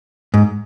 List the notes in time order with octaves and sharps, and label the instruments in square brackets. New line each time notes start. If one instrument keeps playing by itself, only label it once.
[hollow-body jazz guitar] G#2